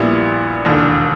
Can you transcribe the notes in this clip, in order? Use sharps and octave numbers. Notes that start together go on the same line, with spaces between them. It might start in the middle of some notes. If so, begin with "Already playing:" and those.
Already playing: A#1 A#2 G3 B3 E4
E1 D#2 D3